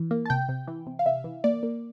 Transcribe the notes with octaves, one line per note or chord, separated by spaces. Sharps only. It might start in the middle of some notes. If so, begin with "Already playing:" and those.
Already playing: E3
A#3
A5
C3 G5
C3
E3
C3
F5
C3 E5
E3
A#3 D5
A#3